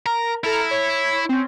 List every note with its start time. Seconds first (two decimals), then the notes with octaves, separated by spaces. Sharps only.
0.06 A#4 A#5
0.44 E4 A4 A#5 F6
0.71 C#5
1.29 C4 C#4